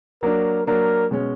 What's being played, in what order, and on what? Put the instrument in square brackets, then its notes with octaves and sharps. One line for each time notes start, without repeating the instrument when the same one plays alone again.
[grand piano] F#3 A#3 D4 [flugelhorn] A#4
[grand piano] F#3 A#3 D4 [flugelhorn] A#4
[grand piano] B2 G#3 C#4